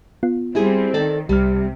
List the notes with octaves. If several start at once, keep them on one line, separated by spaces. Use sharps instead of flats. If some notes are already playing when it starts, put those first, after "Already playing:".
B3 F4
G3 C4 E4 G4 G#4
D#3 A4 D5
C2 C3 G3 F6